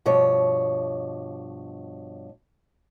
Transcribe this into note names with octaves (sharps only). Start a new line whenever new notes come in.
G2 B2 F3 C#5